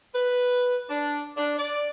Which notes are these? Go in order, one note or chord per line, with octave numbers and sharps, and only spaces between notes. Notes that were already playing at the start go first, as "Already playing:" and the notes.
B4
D4
D4
D5